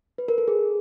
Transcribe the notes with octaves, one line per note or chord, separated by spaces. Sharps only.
B4
A#4
A4
G#4